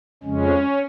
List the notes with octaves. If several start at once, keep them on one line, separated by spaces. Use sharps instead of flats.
F2 C#3 G#3 C#4